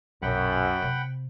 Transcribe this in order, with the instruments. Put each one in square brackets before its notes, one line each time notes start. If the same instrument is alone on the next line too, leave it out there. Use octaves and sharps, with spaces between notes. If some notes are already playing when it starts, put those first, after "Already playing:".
[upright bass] B1 A#2 [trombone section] F#2 [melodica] F#5 G5 B5
[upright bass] C3